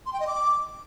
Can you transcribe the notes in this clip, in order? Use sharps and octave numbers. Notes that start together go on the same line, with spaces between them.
C6
G5
D#5
D6